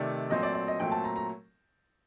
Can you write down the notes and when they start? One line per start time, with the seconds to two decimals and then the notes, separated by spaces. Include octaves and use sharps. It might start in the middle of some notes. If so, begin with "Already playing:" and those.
Already playing: C3 D#3 A3 D5
0.30 A#2 F#3 A3 C4 D#5
0.43 D5
0.54 D5
0.67 D#5
0.79 A#2 F#3 A3 C4 G5
0.92 A5
1.04 A#5
1.16 A#5